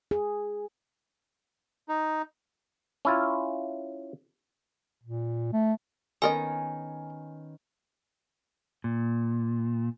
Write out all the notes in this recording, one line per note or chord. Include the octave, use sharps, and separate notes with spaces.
G#4
D#4
C#4 E4 F4
A#2
A3
D#3 B3 C#4 A4 A#4 D#5 G#5
A#2